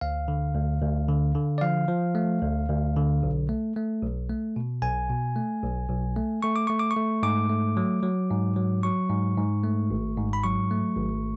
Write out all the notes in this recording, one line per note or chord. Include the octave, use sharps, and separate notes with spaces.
D2 F5
D3
D2
D2
D3
D3
D5
F3 F5
F3
A3
D2
D2
D3
B1
A3
A3
B1
A3
B2
B1 G#5
B2
A3
B1
B1
A3
A3 C#6
D6
A3 C#6
D6
C#6
A3
G#2 D6
A3
F#3
F#3
G#2
F#3
F#3 C#6
G#2
G#2
A3
G#1
G#2
B5
F#3 C#6
A3
G#1